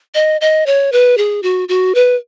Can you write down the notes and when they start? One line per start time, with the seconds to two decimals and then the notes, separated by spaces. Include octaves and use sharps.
0.14 D#5
0.41 D#5
0.66 C#5
0.92 B4
1.18 G#4
1.43 F#4
1.69 F#4
1.95 B4